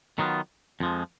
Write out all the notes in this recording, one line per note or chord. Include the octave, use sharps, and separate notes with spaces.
D#3 F#3 B3 F4
F2 F3 G#3